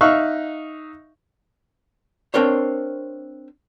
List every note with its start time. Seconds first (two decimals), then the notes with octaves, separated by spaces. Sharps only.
0.01 D#4 E5 F5 C#6 F#6
2.34 C4 D4 A#4 C5 C#5